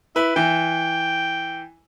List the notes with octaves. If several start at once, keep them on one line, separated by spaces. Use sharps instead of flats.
E4 B4
E3 G5